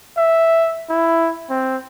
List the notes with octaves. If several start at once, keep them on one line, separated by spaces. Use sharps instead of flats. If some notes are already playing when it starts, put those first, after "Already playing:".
E5
E4
C4